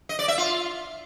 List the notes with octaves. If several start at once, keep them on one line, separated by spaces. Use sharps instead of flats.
D#5
D5
E5
F4